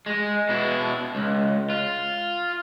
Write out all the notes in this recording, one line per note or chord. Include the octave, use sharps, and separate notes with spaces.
G#3
B2 E4
C#2
F4